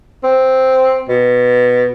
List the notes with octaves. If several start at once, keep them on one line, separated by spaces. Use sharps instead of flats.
C4
B2